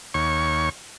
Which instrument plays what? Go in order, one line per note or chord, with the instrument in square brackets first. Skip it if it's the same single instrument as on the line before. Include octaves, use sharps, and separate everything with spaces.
[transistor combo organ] D#2 C#5 C#6